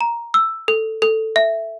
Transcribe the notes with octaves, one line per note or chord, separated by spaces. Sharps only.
A#5
E6
A4
A4
E5